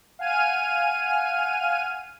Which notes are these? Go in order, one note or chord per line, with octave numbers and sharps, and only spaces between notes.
F5 F#5 G#5 F6 D#7